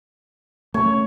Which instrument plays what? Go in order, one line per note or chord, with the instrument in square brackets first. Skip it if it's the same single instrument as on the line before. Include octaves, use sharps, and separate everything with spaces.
[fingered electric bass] A3 C#4 [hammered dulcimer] C#5